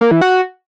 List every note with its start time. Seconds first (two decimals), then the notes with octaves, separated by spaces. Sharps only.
0.01 A#3
0.11 E3
0.21 F#4